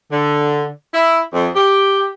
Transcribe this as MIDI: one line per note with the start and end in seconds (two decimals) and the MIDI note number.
0.11 0.69 50
0.94 1.21 64
1.33 1.50 41
1.56 2.10 67